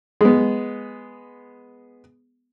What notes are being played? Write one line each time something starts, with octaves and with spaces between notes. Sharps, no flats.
G#3 B3